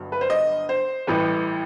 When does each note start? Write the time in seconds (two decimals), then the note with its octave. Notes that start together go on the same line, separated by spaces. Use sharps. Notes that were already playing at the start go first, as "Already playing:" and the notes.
Already playing: G1 G2 F#3
0.12 B4
0.21 C5
0.30 D#5
0.69 C5
1.07 A1 A2 E3 G3 B4